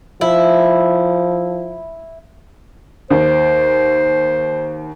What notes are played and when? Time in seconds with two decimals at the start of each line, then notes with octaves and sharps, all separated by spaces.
0.21 F3 E4
3.10 D#2 C5